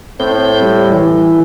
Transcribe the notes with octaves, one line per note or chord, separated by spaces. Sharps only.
A2 C4 G6
G3
E3